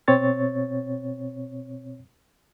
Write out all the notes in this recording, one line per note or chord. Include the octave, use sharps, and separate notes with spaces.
B2 C4 C#5 C#6 A6